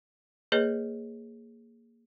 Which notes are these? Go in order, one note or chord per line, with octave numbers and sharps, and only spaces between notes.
A#3 G#4 B4 C#5 D#5